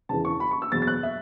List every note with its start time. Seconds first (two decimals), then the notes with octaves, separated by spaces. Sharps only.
0.09 E1 E2 C#3 E3 A5
0.25 C#6
0.40 B5
0.51 C#6
0.62 E6
0.72 E2 B2 F#3 A6
0.82 A6
0.87 F#6
1.03 E5